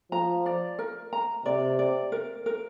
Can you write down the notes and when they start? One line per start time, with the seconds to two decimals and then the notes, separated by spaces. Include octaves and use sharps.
0.11 F3 A#5
0.46 D5
0.79 A#4
1.13 A#5
1.45 C3 D5
1.79 D5
2.12 A#4
2.46 A#4